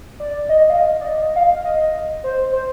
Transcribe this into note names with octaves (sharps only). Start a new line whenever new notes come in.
D5
D#5
F5
D#5
D5
D#5
F5
D#5
C5
C5